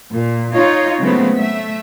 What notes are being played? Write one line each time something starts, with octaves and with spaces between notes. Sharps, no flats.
A#2
D#4 F4 C#5 D#5
C#3 F#3 G#3 A3 B3 C4
A3 E5